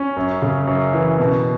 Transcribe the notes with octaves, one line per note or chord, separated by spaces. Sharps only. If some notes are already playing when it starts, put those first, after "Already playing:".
Already playing: C#4
F#2
C#3
F#2
E3
B2